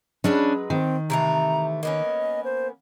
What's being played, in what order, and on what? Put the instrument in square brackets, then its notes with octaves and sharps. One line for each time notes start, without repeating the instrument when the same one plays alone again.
[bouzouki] F#3 G#3 B4 [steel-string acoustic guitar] C#4 D4
[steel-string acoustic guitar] D#3 [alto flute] C4
[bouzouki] C3 E3 A3 [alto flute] A#5
[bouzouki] A#3 B3 C#4 [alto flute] D#5
[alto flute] C5